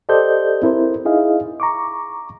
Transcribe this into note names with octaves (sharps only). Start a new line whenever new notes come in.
G4 A4 C5 D5 D#5 G6
C4 E4 A#4 C5
D#4 E4 G#4 D#5 F5
A#5 C#6 D6